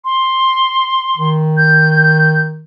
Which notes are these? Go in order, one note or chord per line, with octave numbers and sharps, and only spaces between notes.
C6
D#3
G6